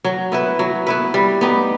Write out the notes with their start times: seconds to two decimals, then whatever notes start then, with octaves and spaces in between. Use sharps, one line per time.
0.04 F#3
0.32 B3 E4 B4
0.59 F#3
0.87 B3 E4 B4
1.14 G3
1.41 B3 D#4 G4